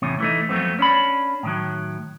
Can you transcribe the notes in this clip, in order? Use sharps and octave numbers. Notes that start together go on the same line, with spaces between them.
E2 A2 C3 C#4
E3 A3 D#4
F2 F#3 A3 B3 C4
C#4 D4 B5
A2 D#3 F#3